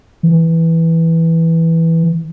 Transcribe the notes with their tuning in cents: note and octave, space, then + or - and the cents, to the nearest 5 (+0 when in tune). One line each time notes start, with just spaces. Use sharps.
E3 -5